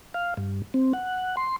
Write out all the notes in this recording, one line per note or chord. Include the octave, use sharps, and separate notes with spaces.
F5
G2
C4
F#5
C6